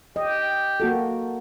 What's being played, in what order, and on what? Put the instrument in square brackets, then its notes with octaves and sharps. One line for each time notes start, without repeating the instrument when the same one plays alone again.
[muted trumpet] G4 [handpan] D#5
[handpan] A#3 F#4 A4